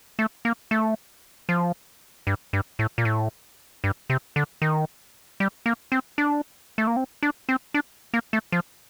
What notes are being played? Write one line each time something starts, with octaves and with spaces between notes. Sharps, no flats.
A3
A#3
A3
F3
G2
G2
A2
A#2
A2
G2
C3
D3
D#3
G3
A#3
C4
D4
A3
A#3
C4
D4
C4
D4
A#3
A3
F3